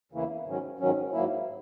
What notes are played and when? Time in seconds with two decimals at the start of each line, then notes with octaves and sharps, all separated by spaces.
0.12 E2 C#3 E3 A#3 E4
0.45 G#2 D#3 F#3 C#4
0.79 G#2 D#3 F#3 C#4
1.13 G#2 F#3 A#3 E4